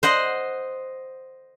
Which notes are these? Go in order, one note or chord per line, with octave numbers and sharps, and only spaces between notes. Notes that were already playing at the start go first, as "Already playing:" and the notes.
C5 D#5 F#5 C6